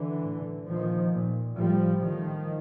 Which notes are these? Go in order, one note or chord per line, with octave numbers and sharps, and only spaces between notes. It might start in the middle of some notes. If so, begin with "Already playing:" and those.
Already playing: D3 E3
A2
A#2 D#3 F3
A#2
A2 F3 G3
A2 D#3 F3